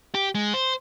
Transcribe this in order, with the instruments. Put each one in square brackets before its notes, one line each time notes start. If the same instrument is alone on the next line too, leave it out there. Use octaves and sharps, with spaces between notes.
[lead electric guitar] G4
G#3
C5